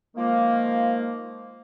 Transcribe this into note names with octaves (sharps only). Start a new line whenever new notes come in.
D#3 F3 G#3 A#3